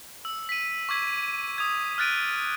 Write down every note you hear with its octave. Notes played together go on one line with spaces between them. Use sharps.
E6
B6 D#7
C#6 D6 E6 G#6 B6
D#6 G#6
F6 F#6 A6 D7 D#7